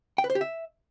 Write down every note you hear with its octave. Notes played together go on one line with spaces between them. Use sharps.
G5
B4
C5
G4
E5